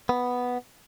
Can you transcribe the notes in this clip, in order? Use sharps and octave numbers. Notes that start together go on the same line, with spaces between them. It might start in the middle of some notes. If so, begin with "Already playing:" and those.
B3